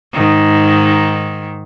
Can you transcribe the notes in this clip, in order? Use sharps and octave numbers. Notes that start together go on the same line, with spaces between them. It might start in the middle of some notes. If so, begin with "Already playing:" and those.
G#2 D#3